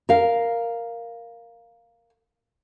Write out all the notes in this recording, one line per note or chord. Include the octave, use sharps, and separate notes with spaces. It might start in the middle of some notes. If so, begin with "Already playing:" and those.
A#4 F5